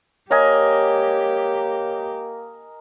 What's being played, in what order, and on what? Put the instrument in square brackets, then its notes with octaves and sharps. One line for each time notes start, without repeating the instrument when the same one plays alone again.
[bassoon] A#3 [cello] G4 [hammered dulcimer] A#4 D#5 G#5 [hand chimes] C#5